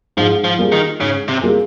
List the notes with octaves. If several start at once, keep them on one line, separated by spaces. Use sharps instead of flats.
G#2 F3
F3
G3 A#3 F4 G#4
D#3
G#2 C#3
C3
G3 A#3 F4 G#4